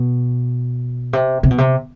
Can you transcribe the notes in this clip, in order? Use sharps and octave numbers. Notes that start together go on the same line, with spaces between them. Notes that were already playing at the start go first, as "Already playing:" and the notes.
Already playing: B2
C3
C3
B2
C3